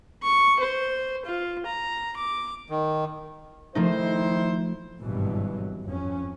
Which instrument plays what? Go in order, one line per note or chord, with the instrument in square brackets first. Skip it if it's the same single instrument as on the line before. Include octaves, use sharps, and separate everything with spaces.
[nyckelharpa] C#6
C5
F4
A#5
D6
[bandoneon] D#3
[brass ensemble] D#3 E4 C5 [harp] F3 A3 D#4
[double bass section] G#1 G2 B2 E3 F#3
F2 C#4